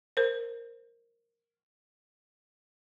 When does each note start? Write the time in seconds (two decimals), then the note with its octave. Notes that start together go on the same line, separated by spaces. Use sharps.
0.17 A#4 C5